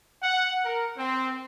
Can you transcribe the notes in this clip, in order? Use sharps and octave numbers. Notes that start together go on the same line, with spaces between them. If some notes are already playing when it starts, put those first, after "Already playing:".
F#5
A#4
C4